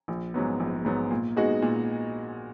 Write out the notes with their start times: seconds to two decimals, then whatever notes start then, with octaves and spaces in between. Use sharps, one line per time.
0.08 A#1
0.34 G#2 F#3 B3
0.60 A#1
0.85 G#2 F#3 B3
1.11 A#2
1.36 G#3 B3 D#4 F#4
1.62 A#2